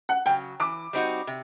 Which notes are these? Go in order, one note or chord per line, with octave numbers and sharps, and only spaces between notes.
F#5
C#3 F#3 G5
E3 D6
G3 C4 D#4 F#4
C3